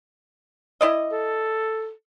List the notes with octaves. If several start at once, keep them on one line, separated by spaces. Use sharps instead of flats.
E4 D5 D#5
A4